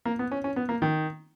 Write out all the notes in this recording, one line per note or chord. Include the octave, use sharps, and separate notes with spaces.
A#3
B3
C#4
C#4
B3
A#3
D#3